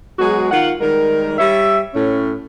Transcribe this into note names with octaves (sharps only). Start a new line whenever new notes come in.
F#3 G#3 B3 F#4 G#4
D#3 F4 F#5
D#3 G3 G#3 A#4
G3 C#5 E5
A2 C#4